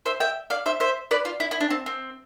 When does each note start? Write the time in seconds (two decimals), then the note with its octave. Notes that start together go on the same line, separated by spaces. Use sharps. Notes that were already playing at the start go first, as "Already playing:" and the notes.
0.06 C5 E5
0.20 E5 G5
0.50 D5 F5
0.66 C5 E5
0.80 C5 E5
1.11 B4 D5
1.25 F4
1.40 E4
1.51 E4
1.60 D4
1.70 C4
1.86 C4